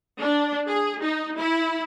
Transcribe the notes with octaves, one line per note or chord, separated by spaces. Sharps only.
D4
G#4
D#4
E4